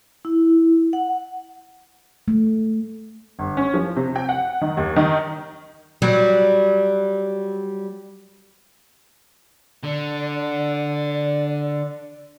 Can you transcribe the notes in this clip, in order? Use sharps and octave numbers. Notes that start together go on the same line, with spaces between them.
E4
F#5
A3
G1
C#4
F3
C3
G5
F#5
D#3
D#2
D#3
F#3 G3
D3 D5